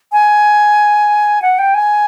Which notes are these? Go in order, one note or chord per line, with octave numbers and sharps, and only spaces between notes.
G#5
F#5
G5
G#5